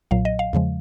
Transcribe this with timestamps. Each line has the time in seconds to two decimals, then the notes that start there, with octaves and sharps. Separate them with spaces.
0.11 B1 A#2 F#3 F5
0.25 D#5
0.39 F5
0.53 E2 C#3 F3 G#3